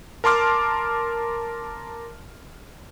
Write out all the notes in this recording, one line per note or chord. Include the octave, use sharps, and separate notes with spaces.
A#4 A5 C6 D6 F6